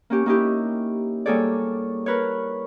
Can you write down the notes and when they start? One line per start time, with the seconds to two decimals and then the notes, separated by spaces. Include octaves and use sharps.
0.10 A#3 C#4 G4
0.26 A#3 D#4 E4 G4
1.26 G3 A#3 G#4 A4 C#5 D5
2.06 A#4 B4 C#5